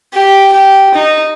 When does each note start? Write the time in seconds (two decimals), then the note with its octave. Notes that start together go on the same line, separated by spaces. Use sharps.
0.14 G4
0.53 G4
0.95 D#4